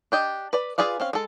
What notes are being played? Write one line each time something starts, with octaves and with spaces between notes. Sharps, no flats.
D4 G4 D#5
B4 D5 B5
F4 G#4 B4 D5 F5
C4 C#4 F5
G#3 A4